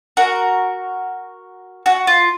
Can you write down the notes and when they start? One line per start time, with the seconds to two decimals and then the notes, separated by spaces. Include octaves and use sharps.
0.17 F#4 A#4
1.86 F#4
2.07 F4